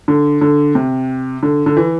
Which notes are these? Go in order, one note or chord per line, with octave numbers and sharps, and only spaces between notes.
D3
D3
C3
D3
D3
E3